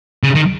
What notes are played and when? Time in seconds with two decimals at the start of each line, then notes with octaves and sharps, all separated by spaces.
0.23 C#3
0.35 D#3